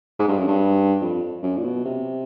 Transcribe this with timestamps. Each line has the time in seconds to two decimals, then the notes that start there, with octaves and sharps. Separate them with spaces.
0.19 G#2
0.28 G2
0.38 F#2
0.48 G2
1.01 F2
1.43 F#2
1.58 A#2
1.64 B2
1.85 C3